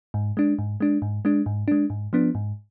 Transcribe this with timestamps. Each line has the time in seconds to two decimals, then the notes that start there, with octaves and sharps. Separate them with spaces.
0.14 G#2
0.37 G#3 D4
0.59 G#2
0.80 G#3 D4
1.02 G#2
1.25 G#3 D4
1.46 G#2
1.68 G#3 D4
1.90 G#2
2.13 F3 B3 D4
2.35 G#2